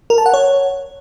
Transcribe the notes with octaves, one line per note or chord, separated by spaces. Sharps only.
A#4
A5
F#5
C#5